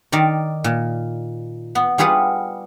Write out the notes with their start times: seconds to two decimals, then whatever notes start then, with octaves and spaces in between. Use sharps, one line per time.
0.12 D#3 A#4 D5
0.64 A#2
1.75 B3
1.98 G3 F4 G#4 B4 F#5